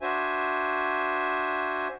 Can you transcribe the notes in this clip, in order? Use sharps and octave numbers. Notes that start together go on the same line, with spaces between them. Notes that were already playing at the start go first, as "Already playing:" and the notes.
D4 F#4 C5 E5 G#5